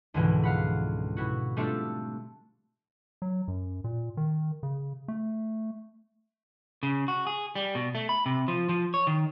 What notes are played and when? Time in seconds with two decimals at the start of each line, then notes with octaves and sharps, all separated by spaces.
0.14 C#2 G#2 B2 D3 E3 F3
0.43 F5 F#5 B5
1.17 B2 E4 F#4
1.57 G3 A3 C4 D4 F4 A4
3.22 F#3
3.48 F#2
3.84 A#2
4.17 D#3
4.63 C#3
5.08 A3
6.83 C#3
7.08 F#4
7.27 G#4
7.55 G3
7.75 B2
7.95 A3
8.09 B5
8.26 C3
8.48 F3
8.69 F3
8.94 C#5
9.07 D#3